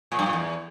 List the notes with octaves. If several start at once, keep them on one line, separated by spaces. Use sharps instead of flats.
A#2
G2
A#2
E2